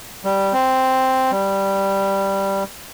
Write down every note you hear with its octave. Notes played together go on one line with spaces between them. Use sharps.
G3
C4
G3